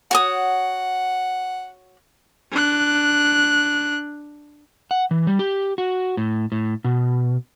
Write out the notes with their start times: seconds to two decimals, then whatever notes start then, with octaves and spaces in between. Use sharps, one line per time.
0.11 F#4 C#5 F#5 D#6
2.52 D4 F#6
4.91 F#5
5.11 E3
5.27 G3
5.39 G4
5.78 F#4
6.17 A2
6.52 A2
6.84 B2